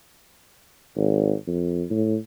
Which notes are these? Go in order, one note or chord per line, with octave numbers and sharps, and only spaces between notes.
G#1
F2
A2